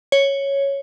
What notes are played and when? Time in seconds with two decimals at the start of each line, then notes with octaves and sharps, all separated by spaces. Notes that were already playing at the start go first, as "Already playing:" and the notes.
0.12 C#5